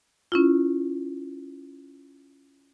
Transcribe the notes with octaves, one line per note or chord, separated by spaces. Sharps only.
C#4 E4 F4